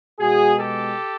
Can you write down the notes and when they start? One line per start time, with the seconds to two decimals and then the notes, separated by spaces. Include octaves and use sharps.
0.20 B2 G#3 B3 F#4 G#4
0.57 G4 A4